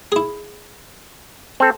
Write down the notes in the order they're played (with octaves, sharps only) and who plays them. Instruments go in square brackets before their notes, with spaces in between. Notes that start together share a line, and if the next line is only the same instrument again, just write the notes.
[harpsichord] E4 G#4
[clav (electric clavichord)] C4 A4